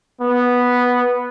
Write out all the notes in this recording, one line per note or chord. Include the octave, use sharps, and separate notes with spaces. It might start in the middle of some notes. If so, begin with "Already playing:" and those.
B3